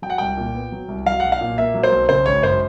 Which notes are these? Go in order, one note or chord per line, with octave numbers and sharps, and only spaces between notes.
F#3 G5
F#5
C2 G5
A#2
B3
F#3
C2
F#3 F5
B1 F#5
F5
A#2
A#3 E5
F#3
C5
B1
C#3 C5
G#1 C#5
F#2 C5